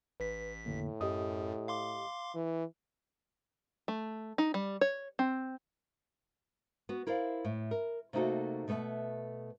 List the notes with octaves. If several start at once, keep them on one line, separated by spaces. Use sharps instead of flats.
A1 B4 B6
F2 A2 D3 A#3
F#2 G4 D#5 D#6
F5 C6 D6
E3
A3
D#4
G3
C#5
C4
B3 F#4
E4 A#4 C5 D5 F5
A2
A#4
C3 A3 A#3 D#4 F#4 A4
B2 A3 B3 B4 E5